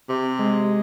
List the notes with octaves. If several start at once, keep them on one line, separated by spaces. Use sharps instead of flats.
C3
G#3